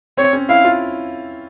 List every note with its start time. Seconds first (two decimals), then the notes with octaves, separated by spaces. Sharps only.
0.18 C4 C#5
0.33 C#4
0.49 E4 F5
0.65 F4